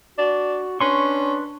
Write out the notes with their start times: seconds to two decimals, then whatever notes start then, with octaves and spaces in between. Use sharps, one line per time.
0.18 D4 F#4
0.80 C#4 D4 B4 C6 C#6